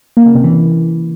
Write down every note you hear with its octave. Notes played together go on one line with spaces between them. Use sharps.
A#3
C#3
C3
E3